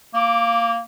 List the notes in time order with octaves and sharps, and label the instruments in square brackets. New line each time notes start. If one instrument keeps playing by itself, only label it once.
[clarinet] A#3 [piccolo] D6